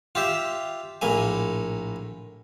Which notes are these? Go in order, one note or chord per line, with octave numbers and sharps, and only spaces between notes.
F4 G4 E5
A#1 A2 A#3 G#5